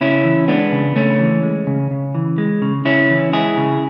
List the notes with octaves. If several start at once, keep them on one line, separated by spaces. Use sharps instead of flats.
C#3 C#4 E4
E3
G#3 B3 D4
C#3
C#3 A3 C#4
E3
G#3
C#3
C#3
E3
G#3
C#3
C#3 C#4 E4
E3
G#3 E4 G#4
C#3